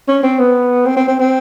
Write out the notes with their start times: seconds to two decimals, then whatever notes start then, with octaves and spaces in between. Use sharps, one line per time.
0.08 C#4
0.23 C4
0.39 B3
0.86 C4
0.97 C4
1.08 C4
1.20 C4